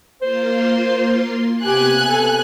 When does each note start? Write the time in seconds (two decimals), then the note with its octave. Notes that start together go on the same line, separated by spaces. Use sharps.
0.22 A#3 F4 C5 C6
1.62 C3 B3 G4 G#5 F#6
2.09 A4